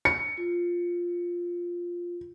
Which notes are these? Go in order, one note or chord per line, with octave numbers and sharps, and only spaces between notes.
C#7
F4